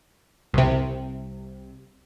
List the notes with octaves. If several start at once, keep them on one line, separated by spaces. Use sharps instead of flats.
C2 C3